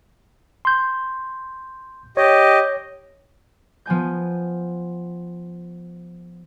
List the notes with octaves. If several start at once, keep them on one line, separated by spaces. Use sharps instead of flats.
C6 G6
G4 C#5 D#5
F3 B3 G#5 G6